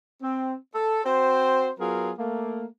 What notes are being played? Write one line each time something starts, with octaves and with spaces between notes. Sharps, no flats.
C4
A4
C4 F#4 C5
F#3 B3 F4 G#4 A#4
A3 A#3